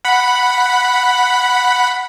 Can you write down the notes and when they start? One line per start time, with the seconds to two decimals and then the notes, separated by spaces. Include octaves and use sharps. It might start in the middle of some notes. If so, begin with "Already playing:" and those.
0.05 F#5 B5